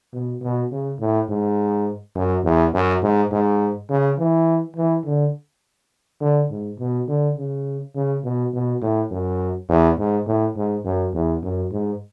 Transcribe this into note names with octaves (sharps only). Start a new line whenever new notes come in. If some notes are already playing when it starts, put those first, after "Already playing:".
B2
B2
C#3
A2
G#2
F#2
E2
F#2
G#2
G#2
C#3
E3
E3
D3
D3
G#2
B2
D3
C#3
C#3
B2
B2
A2
F#2
E2
G#2
A2
G#2
F#2
E2
F#2
G#2